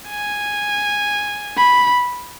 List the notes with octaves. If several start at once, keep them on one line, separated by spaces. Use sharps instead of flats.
G#5
B5